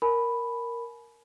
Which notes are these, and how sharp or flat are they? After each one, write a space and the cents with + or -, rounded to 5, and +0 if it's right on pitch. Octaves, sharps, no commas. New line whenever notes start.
A#4 +0 G#5 +40 B5 +0